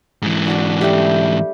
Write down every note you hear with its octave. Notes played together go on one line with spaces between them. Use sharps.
G#2 E3
D4 F#4 D5
G3 A3 G4